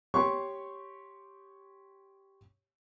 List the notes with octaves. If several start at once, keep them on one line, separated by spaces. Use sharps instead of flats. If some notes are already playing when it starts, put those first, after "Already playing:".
G4 C#5 C6 C#6